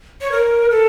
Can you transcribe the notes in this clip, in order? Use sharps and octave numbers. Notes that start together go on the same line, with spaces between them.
C#5
A#4
A4